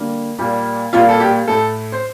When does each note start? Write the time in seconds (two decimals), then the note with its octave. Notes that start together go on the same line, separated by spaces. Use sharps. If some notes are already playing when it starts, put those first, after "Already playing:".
Already playing: D3 G3 A#3
0.38 A#2 G3 A#3
0.93 A#2 G3 A#3 F4
1.09 A4
1.20 G4
1.47 A2 A3 A4
1.92 C5